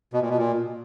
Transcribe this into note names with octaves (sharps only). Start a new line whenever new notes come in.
B2
A#2
B2
A#2